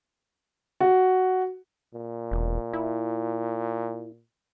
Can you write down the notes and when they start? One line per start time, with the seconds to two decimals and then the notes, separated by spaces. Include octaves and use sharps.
0.80 F#4
1.94 A#2
2.31 E1
2.73 E4